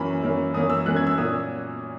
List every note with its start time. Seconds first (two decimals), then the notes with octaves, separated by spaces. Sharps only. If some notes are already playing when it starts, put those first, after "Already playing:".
Already playing: F#2 E3 A#3 C#4 B5
0.23 F#2 E3 A#3 C#4
0.54 F#2 E3 A#3 C#4 D#6
0.70 E6
0.86 F#2 E3 A#3 C#4 F#6
0.96 G#6
1.07 E6
1.18 A#2 A#3 C#4 D#6